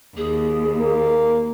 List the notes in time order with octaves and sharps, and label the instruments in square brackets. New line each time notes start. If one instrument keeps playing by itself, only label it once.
[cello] D#2 [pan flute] G#4
[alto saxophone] A#3